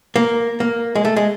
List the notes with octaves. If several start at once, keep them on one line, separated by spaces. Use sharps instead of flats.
A#3
A#3
G#3
A3
G#3